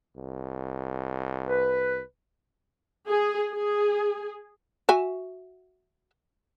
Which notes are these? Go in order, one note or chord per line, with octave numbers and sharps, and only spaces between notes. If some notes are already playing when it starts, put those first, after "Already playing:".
C2
B4
G#4
G#4
F#4 E5 G#5